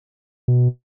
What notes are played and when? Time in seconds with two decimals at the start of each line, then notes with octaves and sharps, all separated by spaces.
0.48 B2